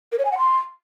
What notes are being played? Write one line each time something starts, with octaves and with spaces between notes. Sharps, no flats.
A#4
C#5
G#5
F#5
C6